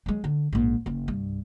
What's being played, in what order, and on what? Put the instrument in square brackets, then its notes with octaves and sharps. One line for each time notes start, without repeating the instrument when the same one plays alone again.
[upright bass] F#3 G#3
D3
A#1 G#2
F#1 C#4
C2 G2